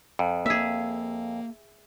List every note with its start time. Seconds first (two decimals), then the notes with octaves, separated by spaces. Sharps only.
0.19 F2
0.46 A#3 G#4 E5